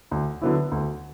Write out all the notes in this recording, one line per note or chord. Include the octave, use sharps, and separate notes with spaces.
D2
D3 F#3 B3 E4
D2